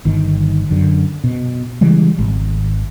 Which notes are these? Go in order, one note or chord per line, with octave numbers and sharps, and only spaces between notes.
G1 D#3
F#2 D3
B2
C#3 E3 G3 G#3
G#1